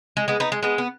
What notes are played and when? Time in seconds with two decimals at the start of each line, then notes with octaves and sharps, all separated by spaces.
0.17 G#3
0.28 G#3 B3
0.40 B3 D#4
0.52 G#3
0.63 G#3 B3
0.78 B3